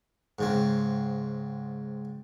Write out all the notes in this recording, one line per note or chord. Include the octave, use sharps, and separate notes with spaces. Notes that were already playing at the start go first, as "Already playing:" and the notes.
G#2 C#3 C4